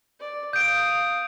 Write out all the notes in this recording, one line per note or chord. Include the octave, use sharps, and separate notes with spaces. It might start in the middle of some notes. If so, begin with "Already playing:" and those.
D5
F5 D#6 G6 D7